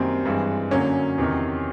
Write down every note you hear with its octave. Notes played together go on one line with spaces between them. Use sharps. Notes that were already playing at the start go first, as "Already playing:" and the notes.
Already playing: F#2 D#3 G3 A#3 C4
G2 E3 G#3
F#2 D3 F#3 A#3 C#4
E2 C3 D#3